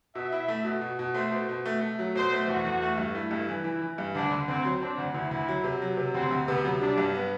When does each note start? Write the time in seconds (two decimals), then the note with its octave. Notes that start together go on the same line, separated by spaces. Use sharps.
0.15 B2 E5
0.32 E4
0.48 A3
0.65 B2
0.81 B2
0.99 B2
1.14 A3 C5
1.32 B2
1.49 B2
1.66 A3
1.81 A3
1.99 F#3
2.15 B2 C5
2.32 A3
2.48 E2 F#4
2.65 E2
2.82 A3
2.98 G2
3.15 A3 E4
3.31 G2
3.49 E3
3.64 E3
3.82 E3
3.98 G2
4.15 D2 D4
4.31 D3
4.48 D2 C4
4.65 F#3
4.81 C4 D4
4.98 D2
5.14 D2 E4
5.31 D2
5.48 F#3
5.64 C3
5.82 F#3
5.97 C3
6.14 D2 C4
6.31 D2
6.48 C3 B3
6.64 F#3
6.81 G3 D4
6.98 G2
7.15 B3